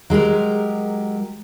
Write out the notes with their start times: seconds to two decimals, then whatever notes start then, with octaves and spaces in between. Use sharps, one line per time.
0.10 F#3 G#3 G4 A#4